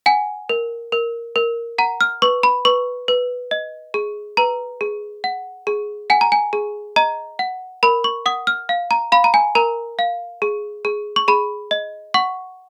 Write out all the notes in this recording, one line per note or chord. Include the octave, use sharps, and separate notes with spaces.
F#5 G#5
A#4
A#4
A#4
F#5 A#5
F6
B4 C#6
B5
B4 C#6
B4
D#5
G#4
B4 A#5
G#4
F#5
G#4
F#5 G#5
A#5
G#5
G#4
D#5 A#5
F#5
A#4 B5
C#6
F#5 D#6
F6
F5
A#5
F5 B5
A#5
G#5
A#4 A#5
F5
G#4
G#4
C#6
G#4 B5
D#5
F#5 C#6